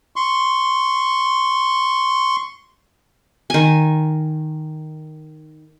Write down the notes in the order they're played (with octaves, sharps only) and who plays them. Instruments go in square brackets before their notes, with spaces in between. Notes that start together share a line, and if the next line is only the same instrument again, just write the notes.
[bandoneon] C6 C#6
[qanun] D#3 G#5